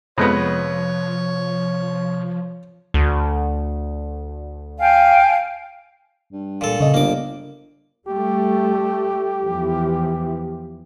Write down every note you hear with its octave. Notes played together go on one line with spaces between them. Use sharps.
F2 C3 F3 G#3 B3 C#5
D2
F5 G5 G#5
G2
A#2 A4
C#3 D#5
G1 A#3 D6
G3 A3 G4
E2 E3 F3